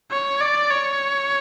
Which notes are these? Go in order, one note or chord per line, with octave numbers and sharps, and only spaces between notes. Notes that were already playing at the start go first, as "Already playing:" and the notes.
C#5
D5
C#5